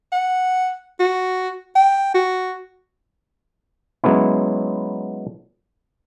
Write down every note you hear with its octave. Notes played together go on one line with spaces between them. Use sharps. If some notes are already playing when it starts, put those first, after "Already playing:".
F#5
F#4
G5
F#4
F#3 G#3 B3 C#4 E4